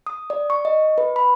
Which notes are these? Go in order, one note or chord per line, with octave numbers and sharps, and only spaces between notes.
D#6
D5
C#6
D#5
B4
B5